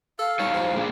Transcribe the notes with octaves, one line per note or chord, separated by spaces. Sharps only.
A4 F5
G3 D#4 A4 C#5
F3
A#3 D4 G#4